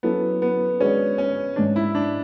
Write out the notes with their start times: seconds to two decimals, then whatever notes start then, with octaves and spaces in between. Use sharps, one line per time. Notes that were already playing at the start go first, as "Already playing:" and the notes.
0.03 F#3 B3 C#4 E4 A4
0.42 B3
0.80 G#3 C#4 D4 F#4 B4 D5
1.18 C#4
1.56 G#2 G#3 C#4 D4
1.76 E4
1.95 D4